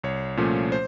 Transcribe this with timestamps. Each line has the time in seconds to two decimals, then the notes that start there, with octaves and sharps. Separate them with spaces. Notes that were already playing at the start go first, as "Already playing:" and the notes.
0.04 C2 C#5
0.37 A#2 F3 A3 C#4
0.72 C5